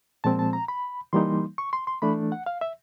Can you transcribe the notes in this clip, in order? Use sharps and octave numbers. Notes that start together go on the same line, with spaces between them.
A#2 F3 G#3 C4 A5
A5
A#5
B5
E3 G3 A#3 D#4 C6
C#6
C6
C6
E3 A3 D4 B5
F#5
F5
E5